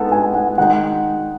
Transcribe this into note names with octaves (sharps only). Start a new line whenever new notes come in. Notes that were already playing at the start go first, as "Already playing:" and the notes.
Already playing: G#3 B3 D#4 A4 F#5
G#5
F#5
D#3 G#3 D#4 F#5